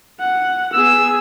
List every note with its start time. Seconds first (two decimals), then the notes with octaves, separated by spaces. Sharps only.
0.20 F#5
0.74 B3 G#4 E6